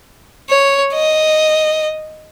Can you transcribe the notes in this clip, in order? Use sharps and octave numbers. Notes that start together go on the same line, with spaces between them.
C#5
D#5